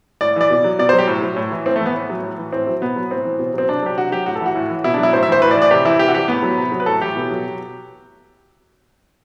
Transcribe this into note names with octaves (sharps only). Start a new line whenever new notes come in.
A2 D5
E3 D5
B2
F#3
B2 D5
C5
F#3
G4
A2
F#3
A2
E3
A2 C4
A3
E3 B3
A2
F#3
A2
E3
A2 C4
F#3
B2 B3
F#3
A2 C4
E3
B2
F#3 C4
C3 D4
F#3 G4
C3 F#4
F#3 G4
A2 F#4
A4
E3 F#4
A2
E3
B2 E4
D4
F#3
E4
A2 C5
E5
E3 C5
A2 B4
D5
E3
D5
C3 G4
E3 E4
C3 G4
F#4
E3 G4
A2 B3
F#3
C3
F#3
B4
A2 A4
E3 G4
B2
F#3